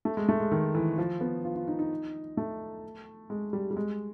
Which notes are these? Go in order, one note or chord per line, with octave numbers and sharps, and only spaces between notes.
A3
G#3
A3
G#3
D#3
E3
F3
B3
F4
F4
D#4
D#4
A3
G#3
G3
G3
G#3